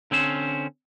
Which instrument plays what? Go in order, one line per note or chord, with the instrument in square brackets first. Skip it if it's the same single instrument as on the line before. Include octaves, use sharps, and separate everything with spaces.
[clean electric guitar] D3 C4 C#4 C5